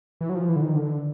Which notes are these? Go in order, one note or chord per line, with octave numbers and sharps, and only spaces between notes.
E3
F#3
F3
E3
D3
D#3
D3